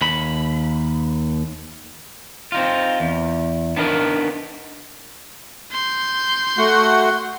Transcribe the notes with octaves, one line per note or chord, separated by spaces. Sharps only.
D#2 B5
C4 D#4 F4
E2
B3 D4 D#4 A#4 B4
C6 G6
A3 F#4 F#5